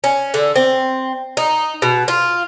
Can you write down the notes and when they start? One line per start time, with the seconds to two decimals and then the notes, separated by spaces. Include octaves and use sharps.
0.04 C#4
0.34 D3
0.56 C4
1.37 D#4
1.82 B2
2.08 F4